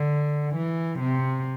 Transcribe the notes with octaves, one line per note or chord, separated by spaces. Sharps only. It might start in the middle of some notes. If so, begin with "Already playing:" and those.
Already playing: D3
E3
C3